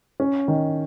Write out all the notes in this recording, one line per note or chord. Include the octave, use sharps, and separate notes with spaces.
C#4
D#3